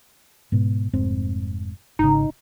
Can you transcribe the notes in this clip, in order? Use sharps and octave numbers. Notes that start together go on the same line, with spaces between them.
G#2 B2 B3
F1 G#2 C4
G#1 C#3 D#4